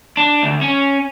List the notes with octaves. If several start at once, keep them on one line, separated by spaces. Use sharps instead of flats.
D4
D2
C#4